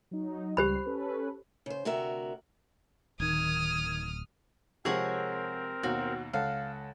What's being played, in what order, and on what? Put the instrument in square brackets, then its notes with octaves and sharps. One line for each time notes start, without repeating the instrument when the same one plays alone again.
[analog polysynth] F#3 D#4
[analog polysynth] C#2 G3 C7 [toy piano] G4 C5 B5
[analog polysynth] C#4 A4 B4
[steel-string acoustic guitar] C#3 C5
D2 C3 F#4 A#4 E5
[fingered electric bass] D1 [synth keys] D#3 G#6 [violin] D#6 F6
[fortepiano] C3 F3 G#3 [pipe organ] C4 A#4 [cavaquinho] G#4 C#5 F#5
[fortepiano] D#2 B2 [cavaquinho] F#4
[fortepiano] C#2 A4 F#5 [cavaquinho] F5